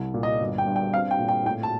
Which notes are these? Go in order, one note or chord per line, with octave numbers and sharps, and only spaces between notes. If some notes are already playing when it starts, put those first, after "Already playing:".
Already playing: C2
A#2
D#5
G1
G5
G2
G5
C4 F5
G5
A#2
G5
A2 G5
A5